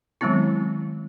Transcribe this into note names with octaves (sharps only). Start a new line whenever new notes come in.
D#3 F#3 G#3 B3 C4 E4